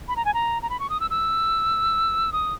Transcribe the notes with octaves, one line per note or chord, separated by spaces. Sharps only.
B5
A#5
G#5
A#5
A#5
B5
C#6
D#6
E6
E6
D#6